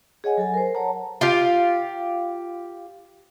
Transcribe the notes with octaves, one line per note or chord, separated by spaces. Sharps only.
G#4 C#5 D#5 F#5 G#5
F#3 A4 G#5
A#4 C5
C#5 F#5 A5 A#5
F4 G4 F5